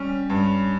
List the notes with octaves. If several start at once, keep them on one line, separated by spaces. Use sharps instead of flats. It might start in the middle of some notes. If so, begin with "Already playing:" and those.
Already playing: G3 C#4
G2